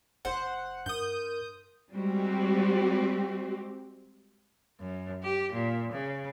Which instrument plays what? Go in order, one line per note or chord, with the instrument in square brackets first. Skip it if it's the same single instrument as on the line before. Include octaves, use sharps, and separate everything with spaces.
[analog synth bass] F#1 [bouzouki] C5 [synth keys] F#5
[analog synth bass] G2 [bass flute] A#4 [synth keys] D#6 G6
[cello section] G3 G#3 C4 F#4 G4
[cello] F#2
G4
A#2
C#3